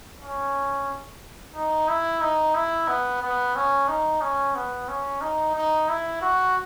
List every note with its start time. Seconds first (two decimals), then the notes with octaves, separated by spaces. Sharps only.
0.22 C#4
1.55 D#4
1.88 E4
2.21 D#4
2.55 E4
2.88 B3
3.22 B3
3.56 C#4
3.88 D#4
4.22 C#4
4.55 B3
4.89 C#4
5.21 D#4
5.55 D#4
5.89 E4
6.21 F#4